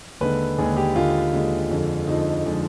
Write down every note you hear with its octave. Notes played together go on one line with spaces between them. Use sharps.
D#2 D3 G#3 B4
D#2 D3 G#3 G#4
G4
D#2 D3 G#3 F4
D#2 D3 G#3
F2 D3 F3 G#3
F2 D3 F3 G#3 D#4
D3 F3 G#3